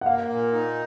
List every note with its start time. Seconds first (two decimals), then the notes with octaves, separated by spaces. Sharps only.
0.01 F#5
0.06 A#3 F5
0.29 A#2
0.52 D#4